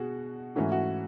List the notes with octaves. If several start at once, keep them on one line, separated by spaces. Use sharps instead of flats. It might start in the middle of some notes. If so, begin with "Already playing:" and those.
Already playing: B2 F#4 G#4
G#2 E3 A3 C#4 F#4
F#4